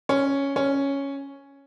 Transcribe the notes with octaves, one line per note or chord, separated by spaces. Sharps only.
C#4
C#4